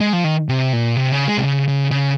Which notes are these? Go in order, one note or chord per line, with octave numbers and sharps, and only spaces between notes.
G#3
F3
D#3
C3
A#2
C3
C#3
G#3
C3
C#3
C#3
C#3